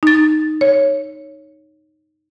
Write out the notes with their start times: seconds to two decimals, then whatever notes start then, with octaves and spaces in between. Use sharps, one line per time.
0.03 D#4 A6
0.61 C#5